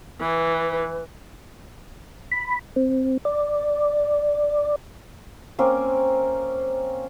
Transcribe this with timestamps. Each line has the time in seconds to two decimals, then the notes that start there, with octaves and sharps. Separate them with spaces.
0.20 E3 B4
2.32 B5
2.76 C4
3.25 D5
5.59 A#3 C4 C#4 A#4